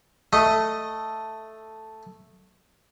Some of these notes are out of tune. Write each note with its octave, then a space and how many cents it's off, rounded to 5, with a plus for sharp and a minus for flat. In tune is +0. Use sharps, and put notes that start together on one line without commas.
A3 +0 D#5 +0